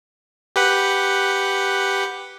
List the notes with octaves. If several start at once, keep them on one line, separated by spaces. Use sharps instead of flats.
G4 B4 F#5